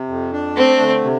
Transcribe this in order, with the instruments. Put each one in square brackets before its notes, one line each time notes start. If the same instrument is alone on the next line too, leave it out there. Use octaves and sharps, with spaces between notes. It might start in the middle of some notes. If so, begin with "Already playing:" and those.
Already playing: [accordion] C3
F2
D4
[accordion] A3 [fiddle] C4
[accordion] D3
C3